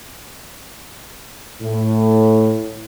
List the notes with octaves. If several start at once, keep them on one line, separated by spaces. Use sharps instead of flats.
A2